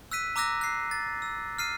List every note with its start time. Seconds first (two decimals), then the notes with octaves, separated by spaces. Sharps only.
0.11 E6 F#6 B6 D#7
0.36 A#5 D6 E6 F#6 A#6
0.61 F#6 C7
0.91 A6
1.22 E6
1.59 F6 C7 D#7